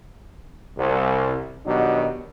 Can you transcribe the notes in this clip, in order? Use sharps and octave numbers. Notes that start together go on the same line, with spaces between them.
C2
B2 D#3 F#3 D4 D#4 G4